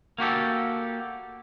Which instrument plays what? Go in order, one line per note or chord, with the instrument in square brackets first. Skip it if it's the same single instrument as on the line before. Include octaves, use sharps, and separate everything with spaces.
[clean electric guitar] A#3 F#4 G4 A4